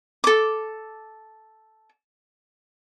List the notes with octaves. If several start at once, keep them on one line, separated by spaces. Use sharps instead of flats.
A4 D6